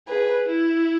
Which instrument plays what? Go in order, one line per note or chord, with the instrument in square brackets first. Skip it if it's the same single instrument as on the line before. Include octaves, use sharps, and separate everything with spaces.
[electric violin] G#4 [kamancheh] B4
[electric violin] E4